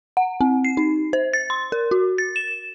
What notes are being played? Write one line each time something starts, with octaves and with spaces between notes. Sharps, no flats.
F#5
C4
C7
D#4
C5
A6
C6
A#4
F#4
A6
E7